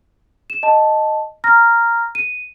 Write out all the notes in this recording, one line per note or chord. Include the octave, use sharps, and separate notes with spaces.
E7
D#5 A5
A#5 F6 A#6
D#7